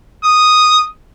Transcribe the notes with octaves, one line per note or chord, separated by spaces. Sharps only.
D#6